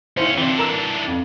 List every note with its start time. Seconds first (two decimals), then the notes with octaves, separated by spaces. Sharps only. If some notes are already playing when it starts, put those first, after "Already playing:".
0.17 D#2 C#4 E4 C5
0.37 E3 C4 D4 F4
0.58 A#4 A#5 E6
1.08 F2